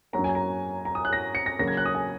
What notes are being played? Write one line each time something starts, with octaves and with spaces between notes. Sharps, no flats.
F#2 F#3 A#3 A#5
G#5
A#5
A#5
D#6
F#6
A#6
C#7
A#6
C#3 F#3 A#3 A#6
G#6
F#6
D#6
G#5